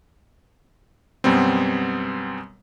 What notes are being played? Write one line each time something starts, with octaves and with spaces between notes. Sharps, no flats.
F#2 B2 G3 B3 C4